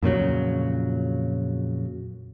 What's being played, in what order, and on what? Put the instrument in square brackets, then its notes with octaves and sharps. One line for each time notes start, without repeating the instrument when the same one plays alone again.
[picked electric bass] F2 A#2 C#3 F#3